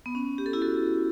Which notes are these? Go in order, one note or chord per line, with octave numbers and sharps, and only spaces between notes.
B3
C#4
G4
A4
E4 G4
F#4 A4